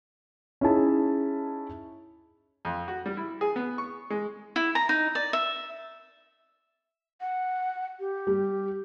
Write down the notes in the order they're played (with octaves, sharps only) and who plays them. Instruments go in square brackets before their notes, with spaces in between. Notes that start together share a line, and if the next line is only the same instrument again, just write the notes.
[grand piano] C#4 D#4 E4 G#4 A5
[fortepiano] F2
F#4
G3
E4
G#4
B3
C#6
G#3
[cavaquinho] E4
A#5
D#4
D5
E5
[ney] F#5
G4
[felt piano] G3